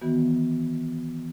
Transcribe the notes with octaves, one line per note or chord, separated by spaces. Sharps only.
D#3 E3 B3 F#4